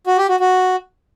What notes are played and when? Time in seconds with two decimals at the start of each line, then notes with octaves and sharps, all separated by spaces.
0.07 F#4
0.18 G4
0.29 F#4
0.40 F#4